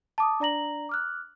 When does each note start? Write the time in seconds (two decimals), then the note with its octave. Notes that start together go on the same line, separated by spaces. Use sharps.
0.18 A5 D6 D#6
0.40 D4 D5 A#5 A#6 F#7
0.89 D6 F6 F#6